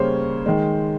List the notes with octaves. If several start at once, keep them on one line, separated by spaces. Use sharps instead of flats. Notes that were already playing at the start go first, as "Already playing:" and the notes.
Already playing: C#3 G3 A#3 C5 C#5
D#3 G#3